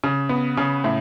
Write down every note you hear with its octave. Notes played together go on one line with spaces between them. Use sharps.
C#3
B3
C#3
A2